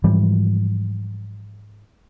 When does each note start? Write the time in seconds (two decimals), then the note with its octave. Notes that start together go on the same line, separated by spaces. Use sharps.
0.04 G#2 E3 F3 G3